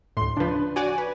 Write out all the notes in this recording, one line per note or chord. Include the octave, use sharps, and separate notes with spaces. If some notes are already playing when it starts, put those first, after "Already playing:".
D2 A2 C6
C#3 F3 D4 B4
F#4 C#5 D5 F#5 G#5
B4